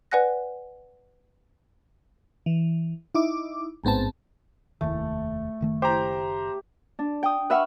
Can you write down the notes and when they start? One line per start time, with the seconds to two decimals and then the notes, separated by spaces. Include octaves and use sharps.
0.11 B4 D5 F#5 G#5 F#6 A#6
2.46 E3
3.15 D#4 E4 D6
3.84 A1 G#2 B3 C4 A5
4.81 F1 D#2 D#3 A3
5.61 F#1 D#3 A3
5.82 G4 C5 A#5
6.99 D4
7.23 G5 D#6
7.50 B4 E5 F#5 C#6 F6